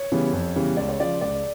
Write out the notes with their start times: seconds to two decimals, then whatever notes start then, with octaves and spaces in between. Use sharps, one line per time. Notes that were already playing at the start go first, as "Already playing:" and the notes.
Already playing: C#5
0.12 C#3 E3 G3 B3
0.33 F2
0.56 C#3 E3 G3 B3
0.77 C#2 D5
0.89 C#5
1.00 C#3 F3 D5
1.21 C#2 D5